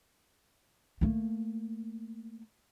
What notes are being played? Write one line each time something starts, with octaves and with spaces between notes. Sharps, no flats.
A3 A#3